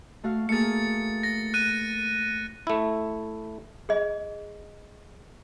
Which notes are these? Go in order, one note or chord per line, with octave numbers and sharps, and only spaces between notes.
A3 F#4 F5
A3 A#3 G#4 A6 C#7
A#6
F#6 D#7
A3 E4
G#4 D#5